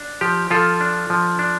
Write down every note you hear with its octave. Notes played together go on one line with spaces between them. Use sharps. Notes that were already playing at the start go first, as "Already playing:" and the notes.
Already playing: D4
F3 G4
F3 F4 A4
D4
F3
D4